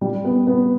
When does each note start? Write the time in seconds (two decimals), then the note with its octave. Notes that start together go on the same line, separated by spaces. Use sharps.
0.01 G3
0.25 B3
0.47 B3